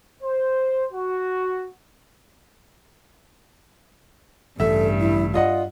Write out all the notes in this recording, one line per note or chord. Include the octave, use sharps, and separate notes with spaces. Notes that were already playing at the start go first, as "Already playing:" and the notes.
C5
F#4
A1 G2 C#3 A4 E5
E4
F4 D5 D#5 F#5